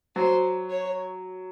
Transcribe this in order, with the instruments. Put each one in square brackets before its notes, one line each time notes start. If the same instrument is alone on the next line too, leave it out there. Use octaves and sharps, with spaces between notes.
[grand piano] F#3 [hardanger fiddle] C5
[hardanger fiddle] C#5